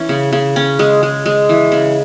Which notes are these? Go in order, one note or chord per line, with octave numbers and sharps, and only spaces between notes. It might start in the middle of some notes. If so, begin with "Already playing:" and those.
Already playing: E3 C#4
C#3
C#3
C#4
G#3
G#3
G#3
E3
C#3